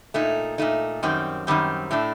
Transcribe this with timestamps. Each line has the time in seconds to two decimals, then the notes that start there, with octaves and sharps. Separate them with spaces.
0.14 A#2 A3 D#4
0.58 A#2 A3 D#4
1.03 F#2 D#3 G3 C4
1.47 F#2 D#3 G3 C4
1.91 A2 A3 D4